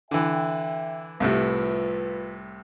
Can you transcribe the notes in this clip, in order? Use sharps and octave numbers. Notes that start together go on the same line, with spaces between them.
D3 E3 E5 G5
C2 A2 C3 F4 B4